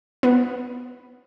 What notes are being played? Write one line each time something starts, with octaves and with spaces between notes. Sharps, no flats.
B3